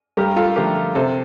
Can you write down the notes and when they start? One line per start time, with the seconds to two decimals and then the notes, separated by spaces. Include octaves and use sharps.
0.17 G2 G4 A#4
0.36 F4 A4
0.56 D3 F3 A3 G4 A#4
0.95 C3 A4 C5